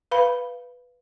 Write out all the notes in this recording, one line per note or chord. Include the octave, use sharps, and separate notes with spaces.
B4 F5 B5